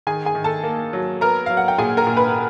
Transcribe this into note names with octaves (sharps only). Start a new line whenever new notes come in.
D#3 G#4 G#5
G#4 G#5
D#3
A4 A5
A#3
F#3
B3 A#4 A#5
F#3 F5
F#5
G5
A#2 G#4 G#5
A#4 A#5
A#2
B4 B5